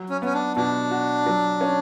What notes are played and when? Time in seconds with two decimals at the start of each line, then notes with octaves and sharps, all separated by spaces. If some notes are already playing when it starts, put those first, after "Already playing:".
Already playing: F#3
0.10 C#4
0.22 B3 C#4
0.34 D4
0.56 B2 D4
0.91 F#4
1.26 F#3
1.61 C#4